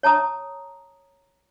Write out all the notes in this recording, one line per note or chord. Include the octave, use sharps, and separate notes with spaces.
C#5 A5 A#5 D#6